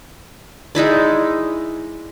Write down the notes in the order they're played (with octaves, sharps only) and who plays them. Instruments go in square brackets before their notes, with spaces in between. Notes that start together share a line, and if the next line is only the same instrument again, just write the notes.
[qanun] G#3 D#4 E4 D5